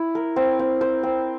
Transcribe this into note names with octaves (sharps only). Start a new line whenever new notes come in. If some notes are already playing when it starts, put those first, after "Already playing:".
Already playing: E4
A#4
C4
C4
C5
C4